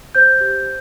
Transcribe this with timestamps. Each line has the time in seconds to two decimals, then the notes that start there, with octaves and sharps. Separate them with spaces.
0.15 C5 G6
0.41 G4